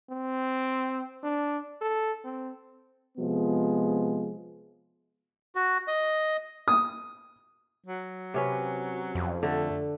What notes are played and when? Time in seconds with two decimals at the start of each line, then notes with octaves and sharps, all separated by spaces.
0.11 C4
1.24 D4
1.81 A4
2.25 C4
3.18 C3 F3 G#3 B3
5.55 F#4
5.88 D#5
6.68 D#6
7.86 F#3
8.34 C3 C#4 B4
9.15 F2
9.43 D3 A3